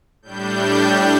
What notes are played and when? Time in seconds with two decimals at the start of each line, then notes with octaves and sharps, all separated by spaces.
0.22 A2 G3 D4 G6